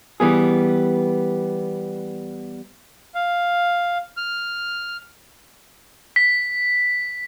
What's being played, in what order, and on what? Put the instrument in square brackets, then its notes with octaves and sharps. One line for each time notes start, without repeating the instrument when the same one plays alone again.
[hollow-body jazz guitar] E3 G3 B3 G#4
[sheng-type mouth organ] F5
F6
[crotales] B6